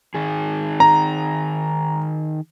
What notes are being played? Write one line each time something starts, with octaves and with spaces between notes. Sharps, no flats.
D#3 G#4
A#5